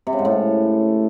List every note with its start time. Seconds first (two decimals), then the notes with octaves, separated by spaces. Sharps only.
0.07 C3
0.13 C#3
0.19 G#2
0.25 A2